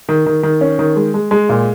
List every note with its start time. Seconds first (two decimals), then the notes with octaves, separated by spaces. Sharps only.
0.09 D#3
0.26 D#3
0.43 D#3
0.61 C#4
0.79 D#3
0.96 G#3
1.14 G#3
1.31 G#3
1.49 A#2